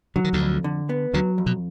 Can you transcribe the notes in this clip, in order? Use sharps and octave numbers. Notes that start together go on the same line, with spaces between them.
D3 F#3
D#3
D2 D3
F2
D3
B3
D2 D3 F#3
F2
B2